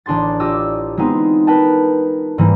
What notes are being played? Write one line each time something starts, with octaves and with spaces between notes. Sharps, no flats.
A1 D4 G#4 C6 A6
F4 G4 D5 D#5 D6 E6
G#3 B3 C4 D#4
A#4 B4 D#5 G5 A5
G#2 E3 G3 A#3